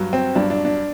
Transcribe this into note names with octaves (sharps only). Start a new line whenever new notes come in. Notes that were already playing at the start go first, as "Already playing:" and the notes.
Already playing: G2 F#3
C4
G2 F#3 D4
D4
D4